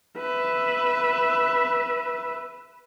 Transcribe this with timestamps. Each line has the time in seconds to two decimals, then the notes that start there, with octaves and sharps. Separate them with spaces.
0.18 B4 E5